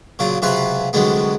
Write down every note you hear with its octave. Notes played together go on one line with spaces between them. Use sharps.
A#2 C#3 F#3 F4
C#2 C3 F#3 F4 B4 F5
C2 D3 F#3 G#3 B3